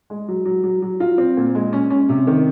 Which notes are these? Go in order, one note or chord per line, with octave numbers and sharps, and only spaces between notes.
G#3
F#3
F#3
F#3
F#3
F4
C4
A#2
G#3
C#4
C#4
C3
D#3